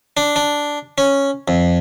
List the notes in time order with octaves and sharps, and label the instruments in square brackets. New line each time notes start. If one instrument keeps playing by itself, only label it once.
[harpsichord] D4
D4
C#4
F2